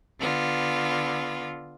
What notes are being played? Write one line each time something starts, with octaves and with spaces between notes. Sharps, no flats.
D3 B3 F4